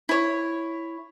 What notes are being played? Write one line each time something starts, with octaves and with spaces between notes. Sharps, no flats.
E4 C#5